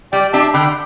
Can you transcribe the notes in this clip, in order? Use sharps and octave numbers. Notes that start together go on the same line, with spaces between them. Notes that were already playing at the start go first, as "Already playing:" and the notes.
G3 D5 G5
D4 G4 E5 A5
D3 G5 B5